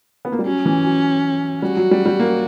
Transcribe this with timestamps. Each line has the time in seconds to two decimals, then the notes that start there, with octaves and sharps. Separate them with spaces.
0.25 B3
0.32 A#3
0.39 G3
0.46 F#3 C#4
0.66 E3
0.84 F#3
1.62 G3 F#4
1.77 F#3
1.91 G3
2.06 G3
2.19 A#3